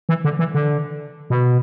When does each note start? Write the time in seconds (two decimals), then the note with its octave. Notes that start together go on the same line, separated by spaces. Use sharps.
0.09 E3
0.24 D3
0.39 E3
0.54 D3
1.30 B2